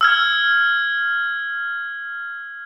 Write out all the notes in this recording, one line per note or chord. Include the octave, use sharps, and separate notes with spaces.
E6 F6 G#6